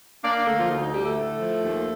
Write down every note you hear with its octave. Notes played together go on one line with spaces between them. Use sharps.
A#3 D4 D5
D4 D5
D3 A3 A4
F3 F4
D2 D#4
D#4
D3 G3 G4
A3 A4
A2
F3
D#2